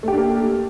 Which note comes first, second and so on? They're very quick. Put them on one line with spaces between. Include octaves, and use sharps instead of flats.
A3 G4 D4 A#3